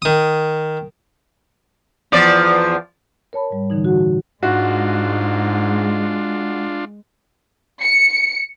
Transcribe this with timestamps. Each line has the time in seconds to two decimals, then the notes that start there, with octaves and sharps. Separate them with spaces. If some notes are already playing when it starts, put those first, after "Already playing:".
0.02 D#3 D#6
2.12 E2 F3 D5
3.33 A#4 C#5 A5 B5
3.51 G#2 G3
3.70 A#2 D3 E3 D#4
3.85 F#4 F#5
4.43 G#2 G#3 D4 F4 F#4
7.81 C#7